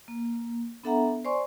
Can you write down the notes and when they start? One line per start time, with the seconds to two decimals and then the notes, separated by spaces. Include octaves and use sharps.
0.08 A#3
0.83 B3 D4 A4 E5 F#5 A#5
1.25 C5 D5 G#5 C6 C#6